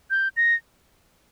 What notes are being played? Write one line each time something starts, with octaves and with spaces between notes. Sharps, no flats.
G6
A#6